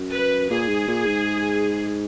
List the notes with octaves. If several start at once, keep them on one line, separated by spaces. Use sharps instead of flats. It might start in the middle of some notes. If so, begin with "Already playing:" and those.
Already playing: F#2
B4
A#2 G#4
G#2
A#2
G#2